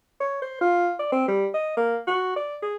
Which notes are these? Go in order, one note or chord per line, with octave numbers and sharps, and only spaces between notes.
C#5
C5
F4
D5
C4
G3
D#5
A#3
F#4
D5
G#4